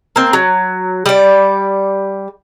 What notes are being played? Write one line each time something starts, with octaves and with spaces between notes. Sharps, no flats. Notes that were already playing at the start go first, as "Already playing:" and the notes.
A#3 C4
F#3
G3 D5